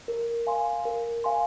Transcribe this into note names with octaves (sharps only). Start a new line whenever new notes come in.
A#4
F5 G#5 C6
A#4
F5 G#5 C6